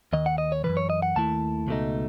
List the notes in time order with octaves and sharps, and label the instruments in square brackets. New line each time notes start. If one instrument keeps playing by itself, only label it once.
[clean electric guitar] D#2 D#3 D#5
F#5
D#5
C#5
C#3 E3 B4
F#2
C#5
D#5
F#5
D#2 D#3 A3 E4 A5
C#2 B2 A3 D#4